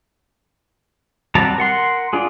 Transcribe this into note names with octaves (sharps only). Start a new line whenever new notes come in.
F#3 G3 C4 A5 A#5
A#4 F#5 C6
D4 F4 G#4